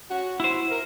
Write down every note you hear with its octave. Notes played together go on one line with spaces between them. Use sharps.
C#4 F#4
E4 F#4 C5
A#4